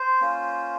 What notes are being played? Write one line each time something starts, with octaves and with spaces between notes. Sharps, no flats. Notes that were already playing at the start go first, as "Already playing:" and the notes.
Already playing: C5
A#3 C#4 F4